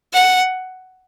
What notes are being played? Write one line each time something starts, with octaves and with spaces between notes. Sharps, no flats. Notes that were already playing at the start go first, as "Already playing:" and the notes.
F#5